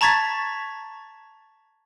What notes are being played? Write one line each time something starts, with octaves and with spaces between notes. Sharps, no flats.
A5 A#5 C#6 G#6 A6 B6